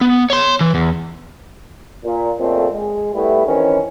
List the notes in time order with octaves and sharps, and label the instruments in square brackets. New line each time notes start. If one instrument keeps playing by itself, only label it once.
[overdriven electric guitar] B3
C#5 C6
E3
E2
[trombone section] A#2
F2 A#2 C#3 A3 C4
G#3
G3 A3 B3 E4
D#3 E3 C4 C#4